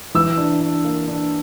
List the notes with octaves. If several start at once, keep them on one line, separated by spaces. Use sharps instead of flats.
E3 E6
D4
D4
A#3
D4